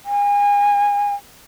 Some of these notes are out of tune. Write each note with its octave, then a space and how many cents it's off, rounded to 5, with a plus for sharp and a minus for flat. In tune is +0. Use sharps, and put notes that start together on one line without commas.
G#5 -30